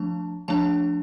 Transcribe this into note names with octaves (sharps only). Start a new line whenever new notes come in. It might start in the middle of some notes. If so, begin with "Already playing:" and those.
Already playing: F3 A3 D4 A5
F3 A3 D4 A5